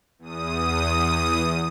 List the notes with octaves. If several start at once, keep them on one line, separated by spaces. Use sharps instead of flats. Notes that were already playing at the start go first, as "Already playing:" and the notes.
E2 D#6